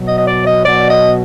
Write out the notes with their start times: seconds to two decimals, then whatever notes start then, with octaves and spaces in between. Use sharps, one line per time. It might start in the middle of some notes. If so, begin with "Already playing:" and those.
Already playing: B2 F#3
0.08 D#5
0.18 D#5
0.28 D5
0.47 D#5
0.65 B2 F#3 D5
0.90 D#5